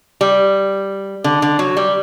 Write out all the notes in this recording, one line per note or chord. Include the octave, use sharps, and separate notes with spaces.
G3
D3
D3
F#3
G3